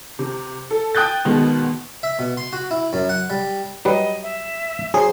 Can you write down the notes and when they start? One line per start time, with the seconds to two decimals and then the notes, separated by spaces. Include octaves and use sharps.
0.19 C3
0.71 A4
0.95 G5 D#6 F#6 G6 A6
1.25 B2 D#3 G#3 B3
2.03 E5
2.19 B2
2.37 C6
2.53 F#4
2.71 E4
2.93 F#2
3.09 F#5
3.30 G3
3.85 F#3 G3 B4 D#5
4.23 E5
4.94 F#3 G#4 C5